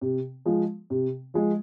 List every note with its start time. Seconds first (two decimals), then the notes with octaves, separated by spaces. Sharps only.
0.01 C3
0.46 F3 G#3
0.90 C3
1.34 F3 G#3